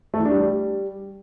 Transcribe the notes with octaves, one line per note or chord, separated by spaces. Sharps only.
A3
E3
D4
G3